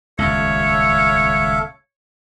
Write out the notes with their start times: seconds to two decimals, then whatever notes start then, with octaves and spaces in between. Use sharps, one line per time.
0.19 D#1 C#2 A4 C#5 E5 F5